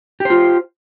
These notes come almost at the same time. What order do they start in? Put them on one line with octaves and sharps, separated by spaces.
G4 C5 F4